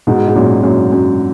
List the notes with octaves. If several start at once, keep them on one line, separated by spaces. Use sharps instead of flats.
G#2 B2
G#2
F#2 A#2
F#2 A#2
F#2